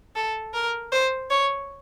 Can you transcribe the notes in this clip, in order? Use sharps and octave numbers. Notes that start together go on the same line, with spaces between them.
A4
A#4
C5
C#5